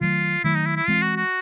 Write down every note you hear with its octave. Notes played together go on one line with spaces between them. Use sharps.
D#3 F#3 A3 F4
D#3 F#3 A3 E4
D#4
E4
E4
E3 G#3 C4 F4
F#4
F#4